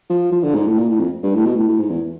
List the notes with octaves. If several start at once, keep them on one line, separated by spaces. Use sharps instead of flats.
F3
F3
D3
G#2
A2
A#2
A2
F2
G2
A2
B2
A2
A2
G#2
E2